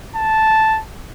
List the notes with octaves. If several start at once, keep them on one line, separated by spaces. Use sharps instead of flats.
A5